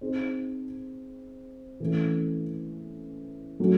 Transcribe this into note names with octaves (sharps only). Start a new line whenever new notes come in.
C4 D#4 G#4 C5
E3 A3 C#4
F#3 A3 C#4